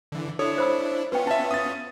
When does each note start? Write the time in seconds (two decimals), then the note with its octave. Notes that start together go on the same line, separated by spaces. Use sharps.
0.12 D3 E3
0.39 D4 E4 A4 C#5
0.58 C5 B5 E6
1.12 B3 C#4 F4 B4 G5
1.27 E5 A5
1.51 D#6 A6